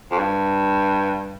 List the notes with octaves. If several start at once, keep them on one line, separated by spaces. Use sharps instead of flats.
F2
G2